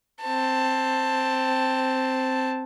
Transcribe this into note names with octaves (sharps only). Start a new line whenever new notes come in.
C4 A5